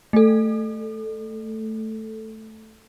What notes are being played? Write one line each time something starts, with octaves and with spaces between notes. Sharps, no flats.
A3 A4